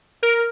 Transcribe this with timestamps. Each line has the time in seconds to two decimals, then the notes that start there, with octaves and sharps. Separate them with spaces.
0.23 A#4